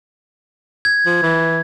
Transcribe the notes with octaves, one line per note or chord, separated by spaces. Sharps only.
G#6
F3
E3